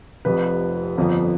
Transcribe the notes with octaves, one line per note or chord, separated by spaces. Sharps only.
F1 F2 C3 F3 B4
G1 F2 D3 F3